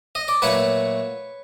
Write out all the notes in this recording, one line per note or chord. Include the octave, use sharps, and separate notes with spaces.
D#5
D5
A#2 F#3 A3 B4 C#5